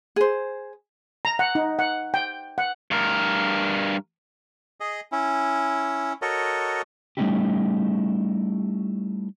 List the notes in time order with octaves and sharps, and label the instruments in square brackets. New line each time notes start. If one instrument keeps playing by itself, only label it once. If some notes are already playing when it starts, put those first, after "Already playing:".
[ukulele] G#4 C5
[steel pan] A#5
F#5
D#4
F#5
G5
F#5
[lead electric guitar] G2 A#4
[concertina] G#4 D#5
C#4 E4
F#4 A4 A#4 C#5 D#5
[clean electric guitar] G3 A3 C#4 D#4 E4 G4